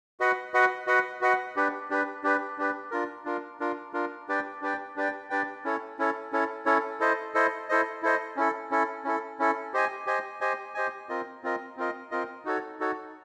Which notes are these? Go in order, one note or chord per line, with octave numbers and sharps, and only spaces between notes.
F#4 B4 D#5 F#5
F#4 B4 D#5 F#5
F#4 B4 D#5 F#5
F#4 B4 D#5 F#5
D4 G4 B4
D4 G4 B4
D4 G4 B4
D4 G4 B4
D4 F4 A#4
D4 F4 A#4
D4 F4 A#4
D4 F4 A#4
D4 G4 B4 D5 G5
D4 G4 B4 D5 G5
D4 G4 B4 D5 G5
D4 G4 B4 D5 G5
C#4 E4 A4 C#5
C#4 E4 A4 C#5
C#4 E4 A4 C#5
C#4 E4 A4 C#5
E4 A4 C5 D#5
E4 A4 C5 D#5
E4 A4 C5 D#5
E4 A4 C5 D#5
C#4 E4 A4
C#4 E4 A4
C#4 E4 A4
C#4 E4 A4
G4 C5 D#5 G#5
G4 C5 D#5 G#5
G4 C5 D#5 G#5
G4 C5 D#5 G#5
C4 F4 A#4 D#5
C4 F4 A#4 D#5
C4 F4 A#4 D#5
C4 F4 A#4 D#5
D#4 F#4 A4 C#5
D#4 F#4 A4 C#5